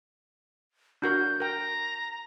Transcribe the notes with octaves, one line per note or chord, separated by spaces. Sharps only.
D4 F#4 A#4 G6
A#4 G5 A#5